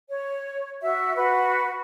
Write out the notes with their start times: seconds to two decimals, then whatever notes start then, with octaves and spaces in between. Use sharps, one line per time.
0.10 C#5
0.81 F#4 E5
1.16 F#4 B4